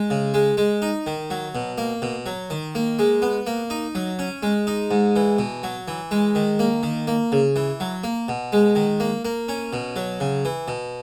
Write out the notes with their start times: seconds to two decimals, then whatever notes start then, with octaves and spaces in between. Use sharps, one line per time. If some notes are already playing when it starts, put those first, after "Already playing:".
Already playing: G#3
0.10 C#3
0.34 G#3
0.57 G#3
0.82 D#4
1.07 D#3
1.30 F#3
1.55 B2
1.78 A#3
2.02 B2
2.26 F#3
2.50 D#3
2.75 A#3
2.99 G#3
3.22 B3
3.47 A#3
3.70 D#4
3.95 F#3
4.19 C#4
4.43 G#3
4.67 D#4
4.91 G#2
5.16 E3
5.39 B2
5.63 F#3
5.88 E3
6.11 G#3
6.35 D#3
6.59 A#3
6.83 D#3
7.07 A#3
7.32 C#3
7.56 E3
7.80 F#3
8.04 A#3
8.28 B2
8.52 G#3
8.75 D#3
9.00 A#3
9.25 A#3
9.48 C#4
9.73 B2
9.96 F#3
10.20 C#3
10.45 E3
10.68 B2